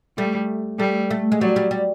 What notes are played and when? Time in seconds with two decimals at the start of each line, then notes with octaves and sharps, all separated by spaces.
0.17 G3 A3
0.79 G3 A3
1.10 A3
1.32 G#3
1.40 F#3 G3
1.56 G3
1.71 G3